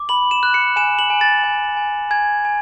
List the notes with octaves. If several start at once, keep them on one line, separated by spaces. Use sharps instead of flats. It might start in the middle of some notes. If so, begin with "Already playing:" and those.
Already playing: D6
B5 F#7
E7
F#6
C#7
G#5 E7
F#7
G#5
A6
G#5
G#5
G#5 G#6
G#5